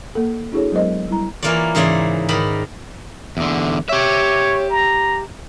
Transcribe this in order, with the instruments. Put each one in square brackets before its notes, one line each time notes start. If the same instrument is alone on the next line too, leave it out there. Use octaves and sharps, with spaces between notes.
[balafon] A#3 A4
D4 E4 F#4 G#4 A4 C#5
F#3 G#3 B3 A#4 C5 D#5
G3 E4 A#5
[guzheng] E3 A#3 F4 C#5 D5
G#2 C#3 E3 C#5 D5 C6
G#2 D#3 D5 B5
[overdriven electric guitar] E2 D3
[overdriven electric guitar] G4 E5 [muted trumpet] C#5
[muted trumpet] A#5